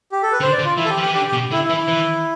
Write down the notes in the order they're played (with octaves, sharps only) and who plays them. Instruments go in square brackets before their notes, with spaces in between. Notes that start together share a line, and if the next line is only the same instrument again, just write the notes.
[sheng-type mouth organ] G4
A4
B4
[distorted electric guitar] D3 [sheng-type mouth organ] C5
[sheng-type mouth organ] D5
[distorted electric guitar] D3
[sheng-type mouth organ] F4
[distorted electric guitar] E3 [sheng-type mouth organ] E4
[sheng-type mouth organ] A4
G4
[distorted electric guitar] F3
[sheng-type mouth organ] G4
[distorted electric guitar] E3
[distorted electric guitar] D3 [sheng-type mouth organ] G4
[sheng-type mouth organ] G4
[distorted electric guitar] B2
[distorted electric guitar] D3 [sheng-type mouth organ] E4
[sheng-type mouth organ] E4
[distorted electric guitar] E3
[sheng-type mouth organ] E4
[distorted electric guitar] E3